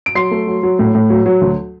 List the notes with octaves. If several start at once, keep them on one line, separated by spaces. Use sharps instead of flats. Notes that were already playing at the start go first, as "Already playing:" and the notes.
D7
F#3 C6 C7
A3
F#3
F#3
A2
A2
F#3
F#3
D2